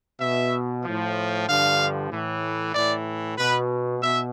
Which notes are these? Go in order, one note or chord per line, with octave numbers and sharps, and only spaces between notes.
B2 E5
A2 F3
G2 D3 F3 F5
A2 E3
A2 E3 D5
B2 B4
B2 E5